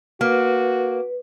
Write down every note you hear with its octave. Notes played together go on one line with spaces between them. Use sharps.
A#3 F#4 B4